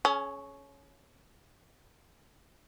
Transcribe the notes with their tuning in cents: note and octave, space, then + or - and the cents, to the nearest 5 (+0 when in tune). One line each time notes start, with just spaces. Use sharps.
C#4 +0 G#4 +40